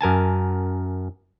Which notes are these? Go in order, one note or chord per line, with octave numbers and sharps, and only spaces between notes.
F#2 A#4 G#5 A5